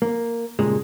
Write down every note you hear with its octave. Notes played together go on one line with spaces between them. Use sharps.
A#3
G2 A#2 C#3 G#3